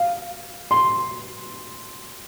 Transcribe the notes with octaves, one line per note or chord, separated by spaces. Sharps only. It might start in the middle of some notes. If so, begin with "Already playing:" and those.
Already playing: F5
C6